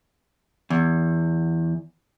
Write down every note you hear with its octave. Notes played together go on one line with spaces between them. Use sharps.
E2